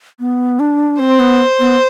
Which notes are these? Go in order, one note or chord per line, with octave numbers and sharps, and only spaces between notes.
B3
D4
C4 C5
B3
B3